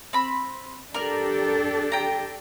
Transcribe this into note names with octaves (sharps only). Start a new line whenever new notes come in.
C4 B5
D4 G4 A4 A#4 D5
G5 A#5